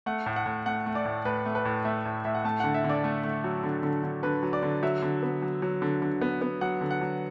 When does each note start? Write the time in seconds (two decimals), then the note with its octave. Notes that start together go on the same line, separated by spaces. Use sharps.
0.06 A3 F#5
0.26 A2
0.36 F#5
0.46 A2
0.66 A3 F#5
0.86 A3
0.95 D5
1.05 A2
1.25 A2 B4
1.46 A3
1.55 B4
1.65 A2
1.85 A3 E5
2.05 A2
2.25 A2 E5
2.35 F#5
2.44 A3 A5
2.60 D3 F#5
2.74 E5
2.84 D3
2.89 D5
3.04 A3 A4
3.24 A3
3.44 F#3
3.63 D3
3.83 D3
4.03 D3
4.23 D3 B4
4.43 F#3
4.53 D5
4.63 D3
4.83 F#3 E5
5.02 D3
5.23 B3
5.42 F#3
5.62 F#3
5.82 D3
6.02 D3
6.21 B3
6.42 B3
6.61 F#3 F#5
6.81 D3
6.91 F#5
7.01 F#3